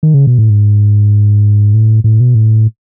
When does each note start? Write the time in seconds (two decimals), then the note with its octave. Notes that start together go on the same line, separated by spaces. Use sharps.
0.03 D#3
0.14 C#3
0.27 B2
0.38 A2
0.50 G#2
1.74 A2
2.04 A2
2.20 B2
2.35 A2